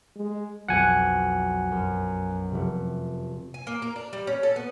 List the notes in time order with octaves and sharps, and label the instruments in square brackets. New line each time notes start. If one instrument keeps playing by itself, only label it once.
[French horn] G#3
[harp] B1 F2 A#6 [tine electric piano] F#5 G#5
[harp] F#2
F1 C3
[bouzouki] G#5
A#3
A#4
D4
G3
C#4
A4
B3